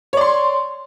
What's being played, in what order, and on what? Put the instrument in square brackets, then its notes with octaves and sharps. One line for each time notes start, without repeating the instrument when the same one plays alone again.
[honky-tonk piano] C#5
D5
C6